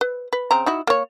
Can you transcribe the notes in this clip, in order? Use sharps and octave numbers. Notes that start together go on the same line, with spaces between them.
B4
B4
C#3 C4 A#5
D#4 E4 F#4
A#3 C#5